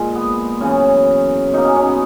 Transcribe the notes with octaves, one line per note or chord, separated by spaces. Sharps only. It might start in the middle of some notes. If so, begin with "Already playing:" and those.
Already playing: A#2 G#3
B3
F#2 C#3 E3 C#4
B2 F#3 A#3 D#4
C#4
C#4
B3